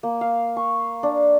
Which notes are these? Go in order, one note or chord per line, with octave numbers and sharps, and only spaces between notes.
A#3
F5
C#6
D4